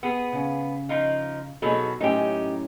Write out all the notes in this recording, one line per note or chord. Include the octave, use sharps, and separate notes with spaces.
B3 G#4
C#3
F3 D#4 F4
B2 F#3 D#4 G#4 A4
F#2 A2 C#4 D#4 G4